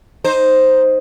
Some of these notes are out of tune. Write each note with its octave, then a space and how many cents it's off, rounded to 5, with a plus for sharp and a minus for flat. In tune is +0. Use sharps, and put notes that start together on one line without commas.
D#4 +0 C5 +0